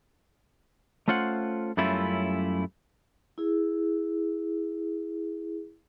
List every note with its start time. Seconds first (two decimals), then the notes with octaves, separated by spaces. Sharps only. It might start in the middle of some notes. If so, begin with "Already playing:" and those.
1.08 A3 C#4 F4 C5 F#5
1.77 F#2 G3 A3 C#4 E4 F4
3.38 E4 G#4